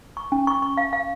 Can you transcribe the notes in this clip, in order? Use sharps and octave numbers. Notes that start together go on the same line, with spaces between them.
C#6
C#4
C#6
C#6
F5
F5